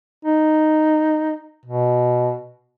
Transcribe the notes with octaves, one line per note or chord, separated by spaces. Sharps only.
D#4
B2